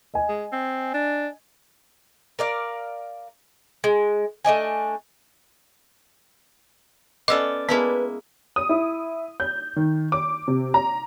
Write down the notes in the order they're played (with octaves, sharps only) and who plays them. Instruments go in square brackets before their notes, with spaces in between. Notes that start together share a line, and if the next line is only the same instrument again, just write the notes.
[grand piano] D#5 G#5
[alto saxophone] G#3
C4
D4
[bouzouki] A#4 D5 F5
G#3
A3 D4 D#5 G#5
[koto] B3 C#4 A4 [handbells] D5 D6 [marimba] D#5 E6
[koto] G#3 A#3 E4 [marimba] B3 [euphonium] B4
[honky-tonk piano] D#6
E4
G6
D#3
D6
C3
A#5